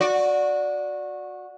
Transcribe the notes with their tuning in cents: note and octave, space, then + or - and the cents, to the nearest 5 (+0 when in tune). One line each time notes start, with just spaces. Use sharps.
F#4 -20 D5 +0